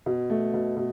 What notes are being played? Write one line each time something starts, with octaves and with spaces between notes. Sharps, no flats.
B2
A3
B2
B2